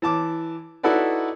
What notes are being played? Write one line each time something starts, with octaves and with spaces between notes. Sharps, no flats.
E3 A5 D6
D#4 E4 F#4 A4 B4 D5